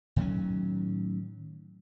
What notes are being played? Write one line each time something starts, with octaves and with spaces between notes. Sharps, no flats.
A2 D#3 F#3 C#4